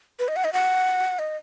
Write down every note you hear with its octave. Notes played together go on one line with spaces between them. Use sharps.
B4
D#5
F#5
D#5
F#5
D#5